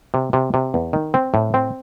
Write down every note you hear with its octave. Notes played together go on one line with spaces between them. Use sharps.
C3
C3
C3
E2
D#3
C4
A2
C4